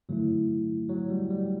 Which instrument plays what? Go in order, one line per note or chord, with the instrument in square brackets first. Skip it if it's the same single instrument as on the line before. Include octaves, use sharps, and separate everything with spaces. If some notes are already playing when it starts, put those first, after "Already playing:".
[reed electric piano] G2 D3 A3 E4 [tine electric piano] F#3
[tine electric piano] F#3
G3
G3